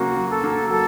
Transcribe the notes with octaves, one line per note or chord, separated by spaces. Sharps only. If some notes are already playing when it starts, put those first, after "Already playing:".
Already playing: C#3 F#3 A#3 C#4 F#4
F#3
A4
A#3
F#3 A4